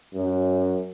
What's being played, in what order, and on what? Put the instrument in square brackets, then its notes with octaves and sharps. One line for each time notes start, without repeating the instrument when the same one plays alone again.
[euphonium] F#2